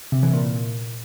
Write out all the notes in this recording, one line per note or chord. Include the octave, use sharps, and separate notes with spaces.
C3
E3
A#2